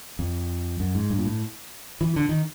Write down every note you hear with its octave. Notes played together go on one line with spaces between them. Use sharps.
F2
F#2
G#2
G2
A#2
A2
E3
D3
D#3